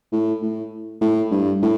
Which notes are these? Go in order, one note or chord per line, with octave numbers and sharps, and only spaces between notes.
A2
A2
A2
G2
A2